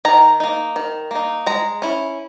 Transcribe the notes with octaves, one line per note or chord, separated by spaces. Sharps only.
D#3 A#5
A#3 D#4
D#3
A#3 D#4
G#3 A#5
C#4 E4